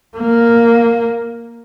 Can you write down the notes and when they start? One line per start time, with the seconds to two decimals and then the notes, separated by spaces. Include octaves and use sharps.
0.17 A#3